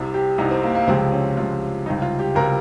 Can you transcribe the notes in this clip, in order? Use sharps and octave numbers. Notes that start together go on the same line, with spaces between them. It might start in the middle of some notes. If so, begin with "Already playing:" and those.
Already playing: C2 C3 G3
G4
C2 C3 G3 D#4
C4
A#3
A#3
C#2 C3 F3 G#3 C4
C#4
C#2 C3 F3 G#3 F4
C#2 C3 G3 D#4
F4
G4
C#2 C3 G3 A#4